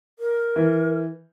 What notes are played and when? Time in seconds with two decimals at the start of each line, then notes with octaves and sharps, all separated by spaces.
0.19 A#4
0.56 E3